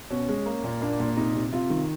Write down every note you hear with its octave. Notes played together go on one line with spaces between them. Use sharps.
B2 C#4
G#3
A#3
A#2
A#3 D4
A#2
C3 D#4
C3
C3 F4
D#3